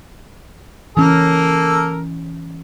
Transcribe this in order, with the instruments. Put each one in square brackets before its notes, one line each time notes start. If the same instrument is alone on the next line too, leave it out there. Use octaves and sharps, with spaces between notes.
[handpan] E3 C#4 [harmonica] A#3 A4 A#4